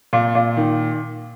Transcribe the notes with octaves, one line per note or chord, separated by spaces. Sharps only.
A#2
A#2
D#3